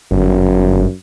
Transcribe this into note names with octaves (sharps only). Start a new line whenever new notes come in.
G1 F#2